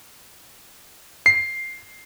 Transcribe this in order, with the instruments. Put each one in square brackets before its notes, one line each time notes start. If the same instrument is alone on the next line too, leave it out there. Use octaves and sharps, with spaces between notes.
[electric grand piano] C7